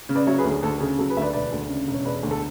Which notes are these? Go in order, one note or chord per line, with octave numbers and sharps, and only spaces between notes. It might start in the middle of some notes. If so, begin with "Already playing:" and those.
C#3
B4 D5
F#3 C#5 E5
G#4 B4
D2
G#4
D2 A4
C#3 G#4
F#3 A4
G#4 B4
D2 E5
B4 D5
E1 B4 D5
D2
C#3
E1
C#5
E1 B4 D5
D2
A4